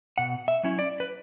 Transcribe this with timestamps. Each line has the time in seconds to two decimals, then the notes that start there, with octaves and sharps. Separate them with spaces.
0.18 B2 F#5
0.48 E5
0.63 F#3 C#4 E4
0.79 D5
1.00 B4